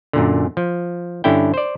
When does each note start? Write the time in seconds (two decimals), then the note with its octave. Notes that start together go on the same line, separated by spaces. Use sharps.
0.13 F#2 A#2 D3
0.57 F3
1.24 G2 D3 C#4 E4 G5
1.54 C5 D5